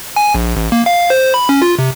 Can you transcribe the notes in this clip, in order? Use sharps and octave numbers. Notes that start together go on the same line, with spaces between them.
G#5
A#1
A1
A#3
F5
C5
B5
C#4
F4
C3